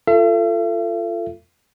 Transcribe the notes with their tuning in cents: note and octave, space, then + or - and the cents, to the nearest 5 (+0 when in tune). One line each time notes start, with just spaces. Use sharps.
F4 -15 A4 +15 E5 +45